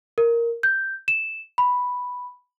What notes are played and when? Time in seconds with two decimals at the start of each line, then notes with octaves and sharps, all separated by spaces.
0.18 A#4
0.63 G6
1.08 E7
1.58 B5